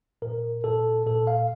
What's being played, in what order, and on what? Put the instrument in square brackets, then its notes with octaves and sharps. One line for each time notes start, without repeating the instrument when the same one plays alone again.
[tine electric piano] A#2 A#4
A#2 A4
A#2 A4
F5